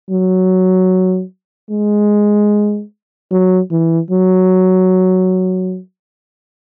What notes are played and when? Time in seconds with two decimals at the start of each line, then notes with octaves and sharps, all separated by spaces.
0.10 F#3
1.71 G#3
3.31 F#3
3.71 E3
4.11 F#3